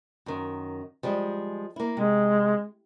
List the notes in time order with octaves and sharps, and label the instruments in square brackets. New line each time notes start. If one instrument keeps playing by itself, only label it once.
[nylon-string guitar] F#2 D#3
F3 G3 G#3
A#3 E4
[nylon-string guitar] C3 [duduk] G#3